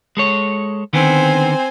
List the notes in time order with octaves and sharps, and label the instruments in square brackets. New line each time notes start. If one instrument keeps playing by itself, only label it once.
[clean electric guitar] G#3 A4 C#5
[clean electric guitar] D3 D#3 B3 [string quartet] C4 C5 G#5